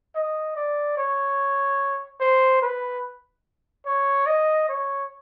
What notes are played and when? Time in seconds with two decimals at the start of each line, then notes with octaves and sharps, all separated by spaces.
0.15 D#5
0.56 D5
0.98 C#5
2.20 C5
2.62 B4
3.86 C#5
4.27 D#5
4.69 C#5